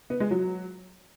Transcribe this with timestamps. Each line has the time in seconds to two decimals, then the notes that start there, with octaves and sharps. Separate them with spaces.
0.10 B3
0.20 G#3
0.31 F#3